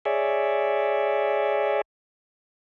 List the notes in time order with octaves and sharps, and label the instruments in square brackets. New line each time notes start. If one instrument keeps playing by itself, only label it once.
[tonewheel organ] G#4 C#5 D5 E5